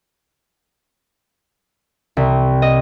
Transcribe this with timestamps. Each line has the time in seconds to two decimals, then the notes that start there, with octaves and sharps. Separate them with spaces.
2.17 C2
2.62 D#5